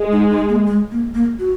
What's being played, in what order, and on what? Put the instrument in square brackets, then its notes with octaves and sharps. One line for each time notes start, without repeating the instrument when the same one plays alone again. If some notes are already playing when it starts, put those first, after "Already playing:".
Already playing: [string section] G#3
[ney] D#4
D#4
A#3
G#3
A#3
A#3
F#4